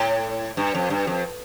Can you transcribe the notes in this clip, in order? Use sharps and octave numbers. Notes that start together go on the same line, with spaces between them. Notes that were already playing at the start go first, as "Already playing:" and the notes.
Already playing: A2
G2
F2
G2
F2